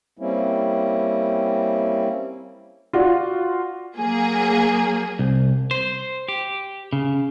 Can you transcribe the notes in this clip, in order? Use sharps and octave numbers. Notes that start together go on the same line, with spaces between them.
G3 A#3 C4 C#4 E4
F4 F#4 D5
F#3 A#3 G#4
C2
C5
G4
C#3